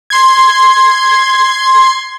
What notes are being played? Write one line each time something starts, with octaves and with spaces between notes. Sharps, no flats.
C6 G#6